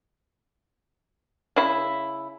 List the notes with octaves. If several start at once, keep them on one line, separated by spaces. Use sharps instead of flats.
C#3 E4